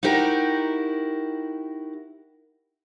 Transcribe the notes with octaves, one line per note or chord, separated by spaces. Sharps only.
D#4 E4 F#4 G4 A#4